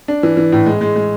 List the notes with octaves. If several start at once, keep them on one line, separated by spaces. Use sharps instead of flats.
D4
E3
E3
A2
G#3
G#3
G#3